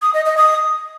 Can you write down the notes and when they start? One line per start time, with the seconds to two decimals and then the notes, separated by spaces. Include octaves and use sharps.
0.02 D#6
0.14 D#5
0.26 D#5
0.37 D#6